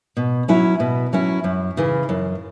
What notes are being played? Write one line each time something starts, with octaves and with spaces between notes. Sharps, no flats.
B2
F#3 C#4 E4
B2
F#3 C#4 E4
F#2
C#3 E3
F#2